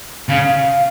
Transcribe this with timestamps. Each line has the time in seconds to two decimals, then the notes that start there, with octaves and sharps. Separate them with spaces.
0.29 C#3 F5